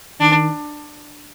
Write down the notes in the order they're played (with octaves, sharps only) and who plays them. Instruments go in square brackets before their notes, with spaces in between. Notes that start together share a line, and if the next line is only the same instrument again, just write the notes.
[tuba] D#3 [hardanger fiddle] D4